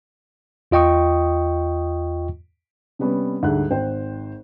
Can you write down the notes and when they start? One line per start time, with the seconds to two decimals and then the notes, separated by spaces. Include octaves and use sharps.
0.71 E2 F4 D#5 G5 C#6 D#6
2.99 C3 G3 B3 C#4
3.43 D2 G#2 G3 F#6
3.71 G#1 C5 G5